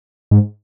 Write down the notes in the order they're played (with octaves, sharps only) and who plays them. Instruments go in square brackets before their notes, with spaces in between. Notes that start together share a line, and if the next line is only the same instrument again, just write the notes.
[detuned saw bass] G#2